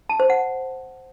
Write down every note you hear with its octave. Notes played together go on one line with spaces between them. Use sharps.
A5
C5
F#5